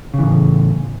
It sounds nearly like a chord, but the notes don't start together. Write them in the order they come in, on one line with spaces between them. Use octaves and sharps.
C#3 E3 A2